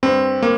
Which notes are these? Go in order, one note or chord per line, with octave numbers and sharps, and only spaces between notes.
G2 C4
A#3